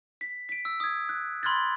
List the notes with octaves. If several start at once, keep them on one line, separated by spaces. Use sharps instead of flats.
B6
B6 D7
E6
D#6 G#6
F#6
B5 C6 F6 F#6 G#6 A6